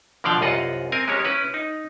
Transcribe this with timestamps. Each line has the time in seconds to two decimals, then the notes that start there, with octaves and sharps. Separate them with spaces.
0.24 B2 D3 F3 D5 F5 G5
0.41 C2 F#2 F4 D#5 F#5
0.92 C4 A#4 G#5
1.08 G#3 A#3 C#4 G4 C#5
1.25 C#4 E4 B4
1.54 D#4